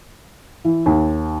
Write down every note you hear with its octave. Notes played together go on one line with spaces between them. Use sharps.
E3
D#2